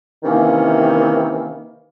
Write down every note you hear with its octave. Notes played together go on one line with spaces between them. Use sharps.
C3 D#3 E3 A#3 C#4